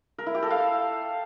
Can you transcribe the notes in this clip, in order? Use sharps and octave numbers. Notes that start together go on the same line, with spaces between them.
A#4
E4
G4
A4
F5